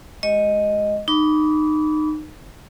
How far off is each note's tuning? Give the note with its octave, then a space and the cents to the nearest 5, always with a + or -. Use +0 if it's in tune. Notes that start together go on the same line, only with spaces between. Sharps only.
G#3 +15 G4 -10 D#5 +0
D#4 -20 B5 +0 D6 -35